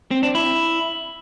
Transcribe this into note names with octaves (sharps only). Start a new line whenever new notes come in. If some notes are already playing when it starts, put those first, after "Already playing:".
C4
D4
E4